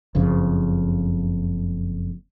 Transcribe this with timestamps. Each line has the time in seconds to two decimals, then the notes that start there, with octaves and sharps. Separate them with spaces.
0.15 F#1 F2 C#3